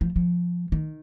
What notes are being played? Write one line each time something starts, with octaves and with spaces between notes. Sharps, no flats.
F3
F3
D#3